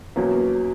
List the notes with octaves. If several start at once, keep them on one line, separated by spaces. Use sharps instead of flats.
E2 B2 F#3 A#3 C#4